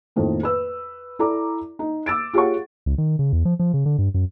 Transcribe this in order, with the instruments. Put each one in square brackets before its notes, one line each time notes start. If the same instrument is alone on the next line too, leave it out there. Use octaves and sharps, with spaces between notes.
[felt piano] F2 A2 D#3 A#3
B4 E6
E4 A4 D5 A#5 D6
D#4
D6 E6 A6 D7
F4 G4 G#4 C#5 F#5 C#6
[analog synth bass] C#2
D#3
C#3
E2
F3
F3
C#3
D3
G2
F#2